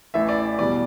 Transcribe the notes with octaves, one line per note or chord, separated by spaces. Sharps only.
A1 A2 E3 E5
D5
E2 B2 G3 D5